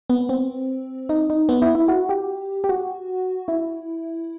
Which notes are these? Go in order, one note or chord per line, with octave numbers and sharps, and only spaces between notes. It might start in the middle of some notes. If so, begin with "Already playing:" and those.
B3
C4
D#4
D#4
B3
E4
E4
F#4
G4
G4
F#4
E4